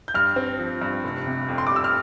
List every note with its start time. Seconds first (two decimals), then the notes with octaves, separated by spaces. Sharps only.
0.08 G6
0.14 G2 F6
0.36 C4
0.59 F3
0.82 G2
1.04 F1
1.27 C3
1.49 F2
1.58 C6
1.67 D6
1.71 G3
1.76 E6
1.84 F6